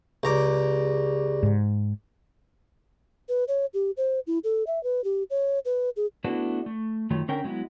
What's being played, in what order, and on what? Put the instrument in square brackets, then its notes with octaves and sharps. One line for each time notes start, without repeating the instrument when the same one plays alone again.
[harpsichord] C#2 A#5 D6 [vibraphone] G4 G#4 D5
[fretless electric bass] G#2
[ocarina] B4
C#5
G4
C5
E4
A4
E5
B4
G4
C#5
B4
G#4
[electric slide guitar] A3 B3 D4 E4 F#4 B4
A3
F#2 D#3 A3 F4 C#5
D3 C#4 A#4 G5
F#3 G#3 B3 E4